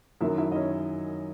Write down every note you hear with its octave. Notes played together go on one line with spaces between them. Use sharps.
F#2 D#3 F#3 E4 E5
E4 E5
D#5
C#4 C#5